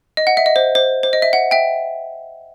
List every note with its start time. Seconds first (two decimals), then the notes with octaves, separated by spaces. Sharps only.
0.17 D#5
0.27 F#5
0.37 E5
0.46 D#5
0.56 C5
0.75 C5
1.03 C5
1.13 D#5
1.22 E5
1.33 F#5
1.51 E5 G5